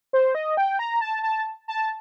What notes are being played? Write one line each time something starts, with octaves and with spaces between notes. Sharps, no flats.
C5
D#5
G5
A#5
A5
A5
A5